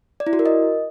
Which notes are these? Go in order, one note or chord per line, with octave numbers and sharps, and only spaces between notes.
D5
E4
F#4
A#4
D#5